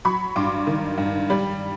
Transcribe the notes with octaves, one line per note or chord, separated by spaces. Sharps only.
F#3 B5 C#6
G2 C6 D6
D#3
G2
G3